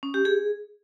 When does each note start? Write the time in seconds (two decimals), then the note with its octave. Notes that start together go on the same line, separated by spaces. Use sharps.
0.03 C#4
0.14 G4
0.25 G#4